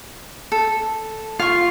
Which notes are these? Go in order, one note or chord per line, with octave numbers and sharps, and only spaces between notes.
A4
F4 F5 C#6